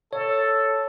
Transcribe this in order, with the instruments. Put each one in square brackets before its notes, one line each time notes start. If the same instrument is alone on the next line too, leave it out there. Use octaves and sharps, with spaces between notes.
[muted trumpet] A4 [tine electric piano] C#5